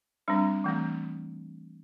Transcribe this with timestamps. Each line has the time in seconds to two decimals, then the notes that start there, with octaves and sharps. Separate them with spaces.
0.28 G3 C4 D4
0.64 E3 A3 C4